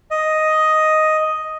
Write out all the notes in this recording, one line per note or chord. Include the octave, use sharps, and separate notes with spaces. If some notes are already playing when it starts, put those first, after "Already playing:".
D#5